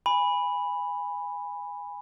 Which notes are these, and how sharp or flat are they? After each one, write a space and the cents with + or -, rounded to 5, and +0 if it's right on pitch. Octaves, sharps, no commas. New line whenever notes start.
G#5 -20 B5 +0